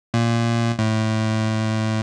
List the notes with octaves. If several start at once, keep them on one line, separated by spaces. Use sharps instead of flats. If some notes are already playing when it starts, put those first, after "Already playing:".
A#2
A2